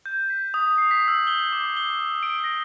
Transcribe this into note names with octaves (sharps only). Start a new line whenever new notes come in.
G6
B6
D#6
C7
B6
E6
G7
D6
G7
D7
A#6